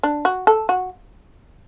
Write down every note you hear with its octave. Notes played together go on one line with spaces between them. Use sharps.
D4
F#4
A4
F#4